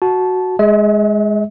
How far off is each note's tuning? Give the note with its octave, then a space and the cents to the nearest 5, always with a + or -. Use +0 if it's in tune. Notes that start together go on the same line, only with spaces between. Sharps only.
F#4 +0 A5 -15
G#3 +0 E5 -45